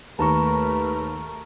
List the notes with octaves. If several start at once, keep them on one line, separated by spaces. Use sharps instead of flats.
D#2 A3 A#4 B4 A5 A#5 C#6